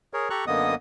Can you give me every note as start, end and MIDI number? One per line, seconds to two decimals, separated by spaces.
0.13 0.29 68
0.13 0.29 70
0.13 0.29 73
0.30 0.45 67
0.30 0.45 69
0.30 0.45 82
0.30 0.45 85
0.30 0.45 90
0.47 0.75 42
0.47 0.75 50
0.47 0.75 58
0.47 0.75 59
0.47 0.75 75
0.47 0.75 87